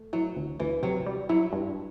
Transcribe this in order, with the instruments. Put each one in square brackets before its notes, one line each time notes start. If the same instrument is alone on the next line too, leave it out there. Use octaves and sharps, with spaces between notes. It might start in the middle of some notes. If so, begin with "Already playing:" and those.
Already playing: [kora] A3
[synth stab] E3 [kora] F#3
[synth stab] D2
[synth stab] D2 [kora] E3
[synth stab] C3 [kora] F#3
[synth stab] G3
[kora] F#3 [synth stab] E4
[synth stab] G2